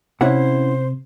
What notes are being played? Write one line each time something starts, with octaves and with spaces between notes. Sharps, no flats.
C3 C#4 E4 C5 F#5